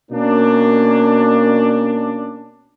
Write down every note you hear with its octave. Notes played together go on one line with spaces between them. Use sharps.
B2 A#3 C#4 D4